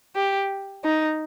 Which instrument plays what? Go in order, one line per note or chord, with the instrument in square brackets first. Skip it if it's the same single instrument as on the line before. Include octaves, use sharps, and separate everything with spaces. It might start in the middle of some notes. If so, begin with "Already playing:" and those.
[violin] G4
D#4